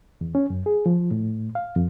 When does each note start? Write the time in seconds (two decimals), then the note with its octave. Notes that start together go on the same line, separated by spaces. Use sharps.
0.21 E2
0.35 C#4
0.50 F#2
0.66 G#4
0.86 F3
1.11 A2
1.55 F5
1.76 F2